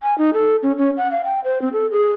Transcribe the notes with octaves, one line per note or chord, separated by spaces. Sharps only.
G#5
D#4
A4
C#4
C#4
F#5
F5
G5
C5
C4
A4
G#4